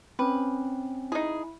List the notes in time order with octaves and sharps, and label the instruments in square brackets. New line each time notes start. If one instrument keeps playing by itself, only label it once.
[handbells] C4 C#4 [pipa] B4
[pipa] D#4 G#4 [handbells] E4